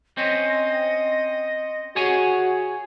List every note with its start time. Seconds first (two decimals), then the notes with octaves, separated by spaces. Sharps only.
0.17 C4 C#4 D#5
1.96 F#4 G#4 C#5 G#5